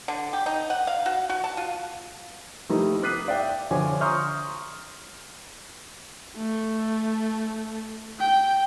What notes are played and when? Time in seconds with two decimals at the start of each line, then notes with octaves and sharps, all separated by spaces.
0.08 D3
0.33 G4
0.46 D#4
0.70 F#5
0.87 F5
1.06 F#4
1.30 F#4
1.44 A5
1.57 F4
2.69 F3 G3 A3 A#3 D#4 E4
3.03 D6 D#6 F#6 B6 C7 D#7
3.28 D5 E5 G5
3.71 D3 F3 C#5 G#5 D6
4.01 A#5 C6 C#6 D#6 F6 G6
6.37 A3
8.19 G5